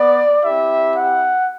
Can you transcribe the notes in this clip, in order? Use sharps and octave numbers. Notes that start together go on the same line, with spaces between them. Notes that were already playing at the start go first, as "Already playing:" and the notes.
Already playing: B3 D5
C4 E4 G4 E5
F#5